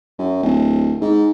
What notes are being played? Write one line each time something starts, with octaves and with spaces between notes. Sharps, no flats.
F#2
D1
G#2